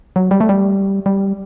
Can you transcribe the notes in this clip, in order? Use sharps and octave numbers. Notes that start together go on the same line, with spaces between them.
F#3
G3
A3
G3
G3